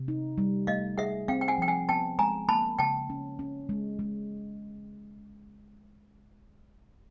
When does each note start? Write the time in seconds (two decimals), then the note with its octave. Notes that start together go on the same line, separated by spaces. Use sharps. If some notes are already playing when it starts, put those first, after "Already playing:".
Already playing: C3
0.08 D#4
0.38 G3
0.67 A3 D#5 F5
0.98 G#4 E5 F#5
1.28 C4 F5 G5
1.41 G5
1.48 F#5 G#5
1.58 F3 G5
1.68 F#5 G#5
1.89 B3 G5 A5
2.18 G#3 G#5 A#5
2.48 A#3 A5 B5
2.79 C#3 G5 A5
3.10 C#4
3.39 C#4
3.69 G#3
3.99 G#3